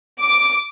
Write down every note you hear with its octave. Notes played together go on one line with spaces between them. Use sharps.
D6